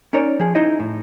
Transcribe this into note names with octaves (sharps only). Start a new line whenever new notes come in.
C#4 D#4 A#4 C#5 D5
F3 G#4
D#4 E4 C5 D#5
A2